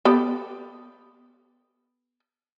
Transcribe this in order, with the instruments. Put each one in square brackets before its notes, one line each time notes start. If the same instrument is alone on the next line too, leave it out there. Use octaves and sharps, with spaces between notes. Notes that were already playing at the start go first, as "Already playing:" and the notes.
[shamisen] B3 G4 A4